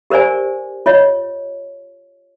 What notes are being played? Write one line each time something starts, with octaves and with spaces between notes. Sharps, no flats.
G4 A#4 C5 D5 G#5
F4 C#5 D#5